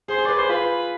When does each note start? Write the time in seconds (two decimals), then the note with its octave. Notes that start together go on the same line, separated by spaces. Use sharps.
0.08 G#4 C5
0.18 G#4
0.26 B4 D5
0.38 G#4 C5
0.49 F4 B4